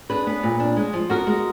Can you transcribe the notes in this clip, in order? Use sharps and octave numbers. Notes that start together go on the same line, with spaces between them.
D4 G#4 B4
B3
A#2
D4
G#3
F3
B3 F#4 A#4
G#3